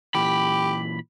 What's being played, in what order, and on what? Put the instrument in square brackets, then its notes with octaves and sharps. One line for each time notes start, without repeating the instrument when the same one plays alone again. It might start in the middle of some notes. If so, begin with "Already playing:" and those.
[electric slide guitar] A#2 E3 [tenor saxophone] G4 [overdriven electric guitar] B5